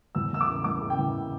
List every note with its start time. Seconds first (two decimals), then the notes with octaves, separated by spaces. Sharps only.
0.15 E2 E6
0.32 E3 E6
0.41 D6
0.49 C#3
0.64 E2 D6
0.81 C#3
0.90 G5
0.98 E3